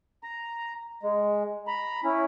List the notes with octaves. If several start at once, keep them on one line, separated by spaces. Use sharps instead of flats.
A#5
G#3
A#5 B5
C#4 E4